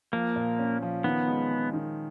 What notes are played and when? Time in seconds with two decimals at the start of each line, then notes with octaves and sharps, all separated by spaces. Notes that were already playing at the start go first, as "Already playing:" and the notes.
0.13 F3 A#3
0.36 A#2
0.59 C#4
0.82 F3
1.04 D#3 B3
1.28 G#3
1.51 G#3
1.73 D#3